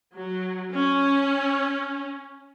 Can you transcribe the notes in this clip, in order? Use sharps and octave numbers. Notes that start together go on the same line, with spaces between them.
F#3
C#4